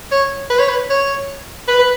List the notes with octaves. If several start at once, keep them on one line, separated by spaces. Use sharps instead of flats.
C#5
B4
C#5
B4
C#5
B4
B4